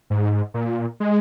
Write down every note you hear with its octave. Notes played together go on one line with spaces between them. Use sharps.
G#2
A#2
G#3